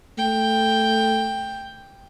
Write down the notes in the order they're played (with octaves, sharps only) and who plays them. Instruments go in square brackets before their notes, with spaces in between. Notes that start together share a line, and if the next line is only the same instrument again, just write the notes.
[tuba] A3 [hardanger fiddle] G5